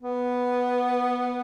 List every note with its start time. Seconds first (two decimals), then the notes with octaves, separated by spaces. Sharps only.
0.01 B3